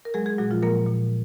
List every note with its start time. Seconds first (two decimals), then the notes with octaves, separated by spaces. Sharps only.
0.05 A#4
0.14 F#3 G#3 G#4
0.26 G#3 G#4
0.38 A#2 F#3 F#4
0.51 F3 F4
0.62 A#2 A#3 A#4
0.86 A#2